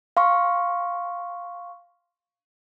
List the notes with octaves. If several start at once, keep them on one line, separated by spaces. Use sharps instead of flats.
F5 C6 C#6